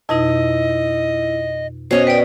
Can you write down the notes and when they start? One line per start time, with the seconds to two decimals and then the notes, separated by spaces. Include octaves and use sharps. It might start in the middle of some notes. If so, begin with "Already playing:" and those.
0.09 F2 B2 D#4 E4 D#5
1.91 B2 C#4 C5 C#5 D#5
2.07 B4 D5 G5